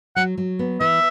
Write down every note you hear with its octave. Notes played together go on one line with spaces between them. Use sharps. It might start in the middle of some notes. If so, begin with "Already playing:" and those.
F#3 F#5
F#3
B3
E3 E5